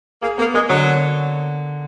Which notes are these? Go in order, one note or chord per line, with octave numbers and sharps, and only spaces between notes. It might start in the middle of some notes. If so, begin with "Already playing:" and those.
A#3 G#4
A#3 B3
G#3 A#3
D3 F#3